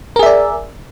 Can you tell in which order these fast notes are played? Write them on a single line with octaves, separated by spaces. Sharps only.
A#4 G#4 E5 D5